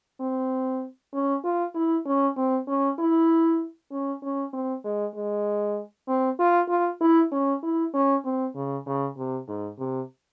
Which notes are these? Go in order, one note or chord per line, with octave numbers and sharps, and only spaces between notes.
C4
C#4
F4
E4
C#4
C4
C#4
E4
C#4
C#4
C4
G#3
G#3
C4
F4
F4
E4
C#4
E4
C#4
C4
C#3
C#3
C3
G#2
C3